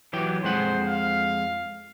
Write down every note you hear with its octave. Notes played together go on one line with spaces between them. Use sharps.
E3 F#3 G4
F2 G#3 C5 F#5
F5